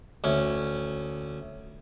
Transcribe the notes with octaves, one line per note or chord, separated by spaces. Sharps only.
D2 C#4